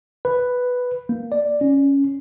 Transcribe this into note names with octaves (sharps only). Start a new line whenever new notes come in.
B4
A#3
D5
C#4